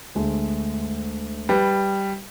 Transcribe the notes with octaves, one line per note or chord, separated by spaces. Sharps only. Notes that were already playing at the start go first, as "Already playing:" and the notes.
D2 G#3 A3
G3 B4